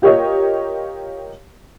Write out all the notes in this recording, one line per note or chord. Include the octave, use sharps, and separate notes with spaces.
F4 G4 A#4 C#5 D#5